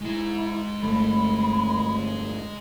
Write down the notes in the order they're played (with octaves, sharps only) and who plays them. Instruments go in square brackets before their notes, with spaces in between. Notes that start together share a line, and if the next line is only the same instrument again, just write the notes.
[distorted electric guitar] G#3 A#5 [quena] E4
[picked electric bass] G1 A3 [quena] B5